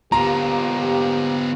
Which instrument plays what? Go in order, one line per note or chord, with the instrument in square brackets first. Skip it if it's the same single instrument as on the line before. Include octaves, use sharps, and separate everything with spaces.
[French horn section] F3 A#3 G4 [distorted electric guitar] B3 F4 [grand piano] A#5